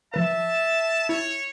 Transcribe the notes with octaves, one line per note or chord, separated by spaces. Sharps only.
F3 B4 E5 A5
E4 C#5